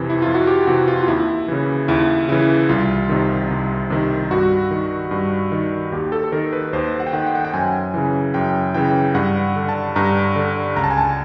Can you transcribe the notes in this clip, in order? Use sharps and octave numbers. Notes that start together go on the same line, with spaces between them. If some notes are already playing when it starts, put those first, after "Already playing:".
Already playing: F2 C3 E3
E4
F2 F4
F#4
G4
C3 E3 F#4
F4
F4
D#2 E4
C#3 E3
D#2 E4
C#3 E3 E4
C2 F4
C3 D#3
C2
C3 D#3
G2 F#4
D#3
G2
D#3
D#2 G4
A4
A4
D#3 A#4
B4
D#2 C5
F#5
G5
D#3 F#5
G5
F#5
G5
F#2 G#5
C#3 E3
F#2 G5
C#3 E3 G5
G2 F#5
D3
A5
G2 A#5
D3
C#2 A#5
A5
G#5
A5